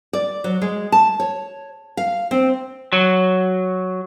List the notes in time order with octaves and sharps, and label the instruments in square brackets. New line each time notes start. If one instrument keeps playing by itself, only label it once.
[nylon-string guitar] D5
F#3
G#3
A5
C#5
F5
C4
[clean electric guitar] F#3